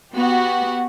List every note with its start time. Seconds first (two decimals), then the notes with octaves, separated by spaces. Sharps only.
0.13 B3 F#4 G4